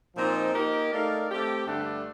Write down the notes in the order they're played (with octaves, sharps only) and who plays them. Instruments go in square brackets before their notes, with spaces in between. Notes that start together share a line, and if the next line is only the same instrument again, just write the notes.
[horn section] A#2 F3 C4 D#4
A#3 D#4 G4 A#4
A3 D#4 A#4 D5 F5
A3 C4 G4
G2 D3 A3 D4